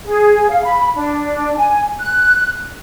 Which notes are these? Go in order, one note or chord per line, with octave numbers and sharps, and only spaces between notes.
G#4
F5
B5
D4
G#5
F#6